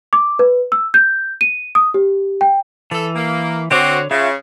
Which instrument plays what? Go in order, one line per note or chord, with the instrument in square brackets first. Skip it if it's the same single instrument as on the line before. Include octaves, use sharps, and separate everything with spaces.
[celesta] D6
B4
E6
G6
D#7
D#6
G4
G5
[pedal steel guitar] E3 [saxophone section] A4
[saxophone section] A#3
[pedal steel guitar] D3 C#5 D6 [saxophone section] C4 F#4
[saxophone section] C#3 [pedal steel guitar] F4 E5 F5